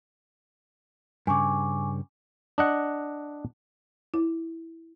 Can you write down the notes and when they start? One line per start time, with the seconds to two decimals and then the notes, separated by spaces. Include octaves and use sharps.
1.27 G2 C#3 G#5 C#6 D6
2.58 D4 D#5 F#5
4.14 E4